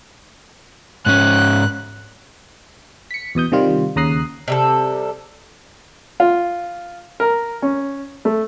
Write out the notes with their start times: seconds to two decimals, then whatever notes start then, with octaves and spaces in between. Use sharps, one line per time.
1.06 G#2 C#4 F#6
3.11 B6 C#7
3.35 E2 B2 D#6 G6
3.52 C3 D#3 G3 F4
3.96 D#2 C#3 A#5 D#6 F#6 C7
4.48 C3 G3 A4
6.20 F4
7.20 A#4
7.62 C#4
8.25 A3